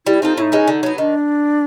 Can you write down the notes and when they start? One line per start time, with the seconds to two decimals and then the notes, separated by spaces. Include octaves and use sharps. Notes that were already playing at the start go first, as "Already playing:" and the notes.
0.06 G3 E4
0.22 C4 D#4 F4 A4
0.37 A2 D#4 E4
0.52 E3 G#3 C#4
0.68 D3
0.83 F#3 B3
0.98 D#3 D4